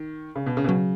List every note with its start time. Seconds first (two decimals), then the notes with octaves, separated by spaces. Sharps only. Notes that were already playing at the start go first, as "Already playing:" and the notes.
Already playing: D#3
0.35 C#3
0.46 B2
0.57 C#3
0.64 B2
0.68 C#3 F#3